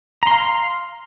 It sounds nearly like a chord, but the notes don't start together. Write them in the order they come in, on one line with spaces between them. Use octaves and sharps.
A#5 C6 F5